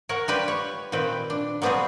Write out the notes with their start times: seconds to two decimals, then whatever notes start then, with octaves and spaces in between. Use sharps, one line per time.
0.09 A#4 C#5 F#5
0.28 G3 F4 G4 B4 C5
0.48 C#5
0.92 A#2 D#3 C4 B4 G5
1.30 D4
1.62 F#3 G3 B3 C4 F4 G#4